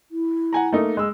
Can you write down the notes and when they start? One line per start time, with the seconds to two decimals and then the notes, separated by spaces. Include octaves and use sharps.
0.11 E4
0.53 F#5 G#5 A#5
0.72 A3 A#3 D#4
0.97 G#3 E6